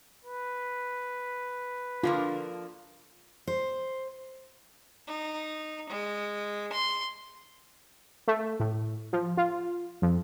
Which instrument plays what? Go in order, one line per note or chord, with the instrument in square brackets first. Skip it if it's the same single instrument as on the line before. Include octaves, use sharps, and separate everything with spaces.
[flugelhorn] B4
[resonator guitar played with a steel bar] D3 F3 A#3 [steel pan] F4 F5
[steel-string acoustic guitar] C5
[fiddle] D#4
G#3
C6
[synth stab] A3
A2
F3
F4
F2